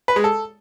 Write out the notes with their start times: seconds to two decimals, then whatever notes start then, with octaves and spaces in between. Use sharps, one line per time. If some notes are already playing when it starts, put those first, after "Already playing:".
0.08 B4
0.16 G#3
0.24 A4